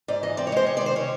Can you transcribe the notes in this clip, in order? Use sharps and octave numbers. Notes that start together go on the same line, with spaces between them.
G#2 D5
E3 D#5
C4 D5
C#5
G#3 C5
C3 C#5
D5
D#3
C5
C#4 C#5